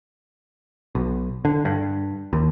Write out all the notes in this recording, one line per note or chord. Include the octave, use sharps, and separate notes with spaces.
B1
D3
G2
D#2